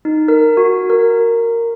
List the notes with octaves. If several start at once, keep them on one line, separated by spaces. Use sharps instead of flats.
D#4
A#4
F#4
A#4